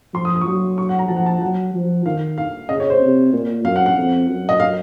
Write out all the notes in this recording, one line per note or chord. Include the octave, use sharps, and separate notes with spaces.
F3 C6
D#6
D#6
C#6
F#3 D#6
C#6
F#5
A#5
F3 A5
F#5
A5
F#3 F#5
F3
D#3 F5
F5
C#3 D#5
C#5
C5
C3
A#2
F#2 F5
F#5
F#5
F2
F#2
D#5
F5